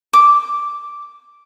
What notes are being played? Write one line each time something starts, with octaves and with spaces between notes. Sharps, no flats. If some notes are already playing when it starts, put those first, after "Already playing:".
D6